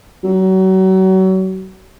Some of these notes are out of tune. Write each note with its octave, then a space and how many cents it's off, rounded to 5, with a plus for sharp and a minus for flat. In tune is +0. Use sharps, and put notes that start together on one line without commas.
F#3 +35